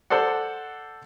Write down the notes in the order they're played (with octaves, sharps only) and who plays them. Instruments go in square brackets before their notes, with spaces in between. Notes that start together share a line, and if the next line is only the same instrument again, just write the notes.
[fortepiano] A4 C5 D5 F#5